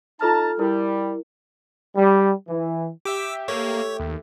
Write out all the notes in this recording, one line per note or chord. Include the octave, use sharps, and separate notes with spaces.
D#4 F4 A4 A5 A#5 F6
G3 E4 A#4
G3
E3
G4 E5 D6 E6
A3 A#3 C#5
D#2